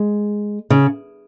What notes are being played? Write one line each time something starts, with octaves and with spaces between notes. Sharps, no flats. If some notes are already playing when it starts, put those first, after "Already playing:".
Already playing: G#3
C#3